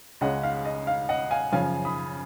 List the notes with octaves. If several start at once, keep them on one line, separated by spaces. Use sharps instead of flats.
C#2 C#3 G#3 C#4 D#5 F#5
F5
D#5
F5
D#5 F#5
F5 G#5
F#2 C#3 F3 F5 G#5
B5 D#6